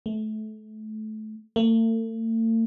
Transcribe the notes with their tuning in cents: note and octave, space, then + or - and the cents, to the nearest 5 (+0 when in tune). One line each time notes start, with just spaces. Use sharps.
A3 -25
A3 +45